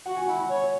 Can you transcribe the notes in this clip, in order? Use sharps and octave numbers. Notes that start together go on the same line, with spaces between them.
F#4 F#5
G#5
E4 F#5
C#5